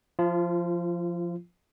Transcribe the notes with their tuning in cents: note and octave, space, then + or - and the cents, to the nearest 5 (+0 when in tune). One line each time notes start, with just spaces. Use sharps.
F3 +0 F4 -30